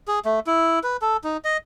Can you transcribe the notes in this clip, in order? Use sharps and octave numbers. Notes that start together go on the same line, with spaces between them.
G#4
A3
E4
B4
A4
D#4
D#5